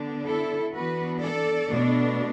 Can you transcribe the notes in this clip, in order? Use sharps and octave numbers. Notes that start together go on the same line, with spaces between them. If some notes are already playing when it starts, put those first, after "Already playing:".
Already playing: D3 B3 D4
E4 A4
E3 B3 D4 F#4 B4
A4 D5
B2 A3 D4